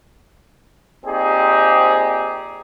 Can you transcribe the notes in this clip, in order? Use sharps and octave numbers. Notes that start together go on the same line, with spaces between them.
A#2 C4 D#4 G4 G#4